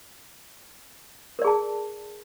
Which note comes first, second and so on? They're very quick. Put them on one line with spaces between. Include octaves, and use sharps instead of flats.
A#4 D5 G#4 A5